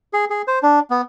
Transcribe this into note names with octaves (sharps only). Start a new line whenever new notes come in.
G#4
G#4
C5
D4
B3